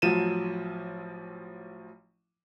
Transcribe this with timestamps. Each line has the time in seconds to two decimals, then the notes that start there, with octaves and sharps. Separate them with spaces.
0.02 A1 F3 F#3 D#7 E7